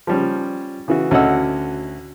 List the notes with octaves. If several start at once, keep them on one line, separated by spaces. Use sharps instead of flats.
F3 G3 C#4
C#3 E3 F#4
D2 C#4 F#4 D#5 F#5 E6